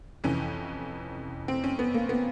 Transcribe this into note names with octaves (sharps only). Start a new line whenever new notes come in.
F2 C3 E3 C#4
C4
C#4
B3
A#3
B3